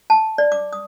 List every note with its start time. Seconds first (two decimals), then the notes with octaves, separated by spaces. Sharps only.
0.10 A5
0.38 D5
0.52 D6
0.73 D#6